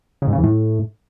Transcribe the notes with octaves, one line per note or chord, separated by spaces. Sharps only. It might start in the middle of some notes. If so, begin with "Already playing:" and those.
C#3
G#2
C#3
E2
A2